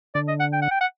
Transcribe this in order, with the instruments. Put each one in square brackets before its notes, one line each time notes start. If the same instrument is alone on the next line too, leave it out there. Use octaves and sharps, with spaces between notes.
[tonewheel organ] D3 [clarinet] D5
[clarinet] D#5
F#5
G5
F#5
G5
F#5